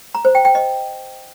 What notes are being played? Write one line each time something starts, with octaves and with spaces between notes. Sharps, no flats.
A#5
C5
G5
G5
D#5